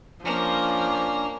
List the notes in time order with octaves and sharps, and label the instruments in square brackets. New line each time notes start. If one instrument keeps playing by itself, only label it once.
[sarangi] F3 [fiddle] A#3 [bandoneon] C#4 D4